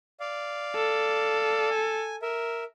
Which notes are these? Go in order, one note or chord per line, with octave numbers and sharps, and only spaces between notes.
D5 F5
A4
G#5
A#4 E5